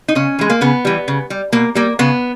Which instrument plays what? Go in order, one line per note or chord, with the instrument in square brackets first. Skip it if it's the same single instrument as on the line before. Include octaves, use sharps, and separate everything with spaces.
[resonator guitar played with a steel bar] D#4
C#3 C#4
E3 G#3
A#3
C#3 B3
E3 G3
C#3
G3
B2 A#3
G3 A#3
C#3 B3